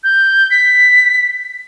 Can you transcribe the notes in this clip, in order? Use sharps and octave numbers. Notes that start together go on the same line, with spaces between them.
G6
B6